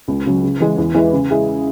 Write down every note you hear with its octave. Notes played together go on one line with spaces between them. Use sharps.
C#2
C#3 F#3
C#3
E3 G#3
E2
E3 G#3 E4 B4
C#3
G#3 E4 G#4